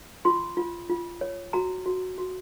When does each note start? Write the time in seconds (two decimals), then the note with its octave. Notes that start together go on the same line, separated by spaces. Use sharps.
0.25 F4 C6
0.57 F4
0.89 F4
1.21 C#5
1.53 F#4 A#5
1.86 F#4
2.18 F#4